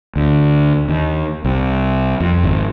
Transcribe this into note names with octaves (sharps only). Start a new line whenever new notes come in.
D2
D#2
C2
F2
G#1